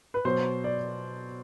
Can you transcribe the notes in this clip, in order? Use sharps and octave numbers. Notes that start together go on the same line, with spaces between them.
B4
B2 F#3 C5
D5